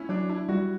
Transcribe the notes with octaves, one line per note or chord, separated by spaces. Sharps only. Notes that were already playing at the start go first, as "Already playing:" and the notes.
Already playing: A3 C#4 E4
F#3 D4
D4 E4
G3 F#4